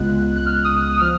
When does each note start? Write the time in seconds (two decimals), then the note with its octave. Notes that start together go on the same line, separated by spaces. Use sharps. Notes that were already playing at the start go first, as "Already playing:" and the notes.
Already playing: C#2 C#3 G#3 B3 F4 F#6
0.36 F#6
0.46 F6
0.64 D#6
0.82 D#6
0.94 D#6
1.00 F3 F6